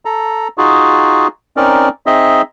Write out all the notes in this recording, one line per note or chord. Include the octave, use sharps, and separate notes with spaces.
A4 A#5
D#4 F4 F#4 G#4
C4 C#4 D#4 A#4 D5
C4 D#4 G#4 D#5 E5